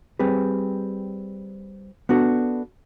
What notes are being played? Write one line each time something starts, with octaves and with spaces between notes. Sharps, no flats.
G3 C4 G#4 B4
B3 D4 F#4 A4